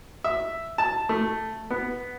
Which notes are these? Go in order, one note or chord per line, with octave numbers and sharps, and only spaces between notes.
E5
A5
A3
B3